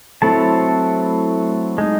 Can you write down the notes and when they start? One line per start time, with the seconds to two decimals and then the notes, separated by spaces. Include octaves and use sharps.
0.22 F#3 A3 C4 E4 A4 A5
1.78 G#3 D#4